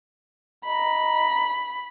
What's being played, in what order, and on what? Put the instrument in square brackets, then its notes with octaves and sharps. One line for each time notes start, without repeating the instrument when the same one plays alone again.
[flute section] D#5 A#5 [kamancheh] B5